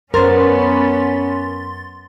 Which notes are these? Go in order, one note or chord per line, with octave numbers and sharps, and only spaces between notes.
F#2 B3 C#4 A#4 C5 C6 A6